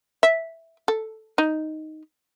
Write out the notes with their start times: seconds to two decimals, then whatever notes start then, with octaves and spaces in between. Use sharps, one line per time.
0.23 E5
0.88 A4
1.38 D#4